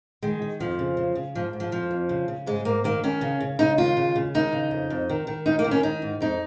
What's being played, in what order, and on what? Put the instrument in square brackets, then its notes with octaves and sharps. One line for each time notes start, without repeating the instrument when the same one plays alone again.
[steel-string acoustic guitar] D#3 G#3
D#3
F2 F3
C#3
C#3
C#3
G#2 F3
G#2
F3
F2 F3
F2
C#3
C#3
G#2 G#3
G#2 A#3
D#3 A#3
D#3 C#4
C#3
C#3
C#3 D#4
D#2 F4
C#3
C#3
D#2 D#4
C#3
F2
F2
D#3
D#3
D#2 D#4
A#3
D#3
C#4
D#3 D#4
G#2
F2 D#4